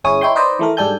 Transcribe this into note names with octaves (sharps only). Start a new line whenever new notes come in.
G1 C#4 E4 G#4 C#5 D#6
D#4 E4 C#5 G5 C6
D#4 B4 C5 D5 D#5
E3 A3 A#4
G#2 G3 D4 A4 G#5 G6